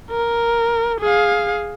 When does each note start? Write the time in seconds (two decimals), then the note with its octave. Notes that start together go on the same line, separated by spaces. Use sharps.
0.11 A#4
1.01 G#4 F5